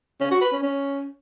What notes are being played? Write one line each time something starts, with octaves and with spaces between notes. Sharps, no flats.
C#4
F#4
B4
C#4
C#4